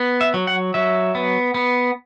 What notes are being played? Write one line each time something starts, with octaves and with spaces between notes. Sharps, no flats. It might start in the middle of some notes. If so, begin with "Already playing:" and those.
Already playing: B3
E5
F#3
F#5
F#3 E5
B3
B3